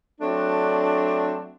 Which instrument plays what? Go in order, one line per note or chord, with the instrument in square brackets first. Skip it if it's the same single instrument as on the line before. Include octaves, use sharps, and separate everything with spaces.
[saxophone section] F#3 A3 C4 D4